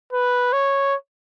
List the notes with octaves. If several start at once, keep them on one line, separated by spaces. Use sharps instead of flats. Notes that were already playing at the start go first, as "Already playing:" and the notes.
B4
C#5